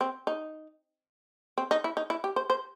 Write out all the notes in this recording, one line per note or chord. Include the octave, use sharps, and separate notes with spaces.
C4
D#4
C4
D#4
E4
D#4
E4
G4
C5
C5